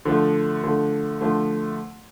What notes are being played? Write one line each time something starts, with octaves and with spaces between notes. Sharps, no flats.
D3 F3 A3
D3 F3 A3
D3 F3 A3